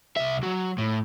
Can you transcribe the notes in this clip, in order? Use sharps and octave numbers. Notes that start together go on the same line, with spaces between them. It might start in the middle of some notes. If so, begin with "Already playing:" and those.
C2 E5
F#3
A2